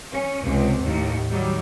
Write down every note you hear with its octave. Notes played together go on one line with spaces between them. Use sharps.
C#4
C#2 C3
D#2 A2
D#3 F#3 G3